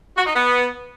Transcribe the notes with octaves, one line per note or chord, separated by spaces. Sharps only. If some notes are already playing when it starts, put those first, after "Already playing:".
F#4
D#4
B3